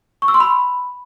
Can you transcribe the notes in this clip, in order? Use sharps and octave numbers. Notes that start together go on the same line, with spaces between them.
C#6
E6
C6
B5